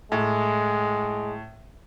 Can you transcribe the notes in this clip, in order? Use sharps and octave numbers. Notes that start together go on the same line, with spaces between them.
A2 G#3